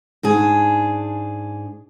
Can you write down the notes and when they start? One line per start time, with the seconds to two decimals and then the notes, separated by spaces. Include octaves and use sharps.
0.23 G#2 D4 G#4